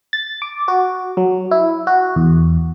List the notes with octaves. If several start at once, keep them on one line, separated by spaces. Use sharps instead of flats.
A6
D6
F#4
F#3
E4
F#4
E2